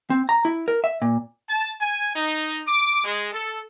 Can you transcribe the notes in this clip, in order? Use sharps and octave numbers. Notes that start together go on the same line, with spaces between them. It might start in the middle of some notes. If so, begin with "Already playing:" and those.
C4
A#5
E4
A#4
E5
A#2
A5
G#5
D#4
D6
G#3
A4